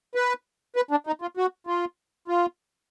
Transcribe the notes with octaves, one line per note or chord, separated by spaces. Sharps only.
B4
B4
D4
D#4
F4
F#4
F4
F4